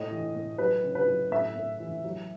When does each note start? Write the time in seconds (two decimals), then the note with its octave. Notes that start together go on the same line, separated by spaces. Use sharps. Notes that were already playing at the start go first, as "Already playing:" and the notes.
Already playing: A2 D#5
0.11 E3
0.35 A2
0.58 F#3 B4
0.84 C#3
0.95 B4
1.07 F#3
1.31 A2 E5
1.56 A2
1.80 E3
2.05 F#3